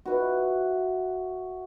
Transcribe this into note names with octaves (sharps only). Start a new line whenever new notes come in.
F#4 B4 E5